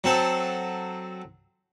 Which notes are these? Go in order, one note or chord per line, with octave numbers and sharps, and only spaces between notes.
F#3 C4 A4